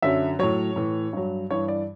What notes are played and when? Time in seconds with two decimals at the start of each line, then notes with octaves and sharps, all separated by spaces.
0.02 F#2 D3 F#3 E5
0.39 A2 F#3 C#5
0.76 A2 E3
1.13 G2 F#3
1.51 G2 E3 C#5
1.68 D5